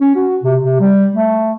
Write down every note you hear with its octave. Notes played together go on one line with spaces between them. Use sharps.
C#4
F#4
C3
C3
G3
A3